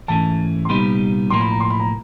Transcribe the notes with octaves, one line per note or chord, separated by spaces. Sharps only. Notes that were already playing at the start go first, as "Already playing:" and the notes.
G#2 E3 A3 C#4 A5
C6
C2 A#2 G3 B3 D#4 B5
B1 A2 F3 A#3 C6
B5
A#5
C6
B5
A#5